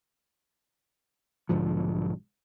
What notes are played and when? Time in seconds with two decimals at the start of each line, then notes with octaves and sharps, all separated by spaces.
1.49 B1 G#2 D3 F3